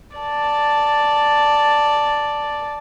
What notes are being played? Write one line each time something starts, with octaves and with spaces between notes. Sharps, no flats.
D5 A5